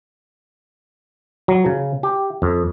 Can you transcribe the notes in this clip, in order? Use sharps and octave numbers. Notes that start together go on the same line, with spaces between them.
F#3
C#3
G4
F2